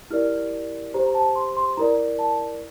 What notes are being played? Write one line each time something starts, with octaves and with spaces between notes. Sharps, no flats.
E4 G4 A#4 D5 F6
G4 C5 A#5
A#5
A5
C6
C6
E4 A#4 D5 A#5
A5